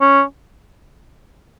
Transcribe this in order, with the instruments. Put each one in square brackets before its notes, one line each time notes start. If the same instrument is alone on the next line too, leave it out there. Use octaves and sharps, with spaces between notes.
[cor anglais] C#4